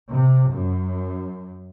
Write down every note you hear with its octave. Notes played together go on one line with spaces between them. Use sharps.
C3
F#2